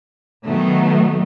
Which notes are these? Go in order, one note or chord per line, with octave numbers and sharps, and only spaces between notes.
B2 D#3 F#3 A3 B3